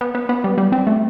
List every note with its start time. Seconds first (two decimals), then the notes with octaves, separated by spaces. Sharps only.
0.01 B3
0.15 B3
0.29 B3
0.44 G3
0.58 G3
0.72 C4
0.87 A3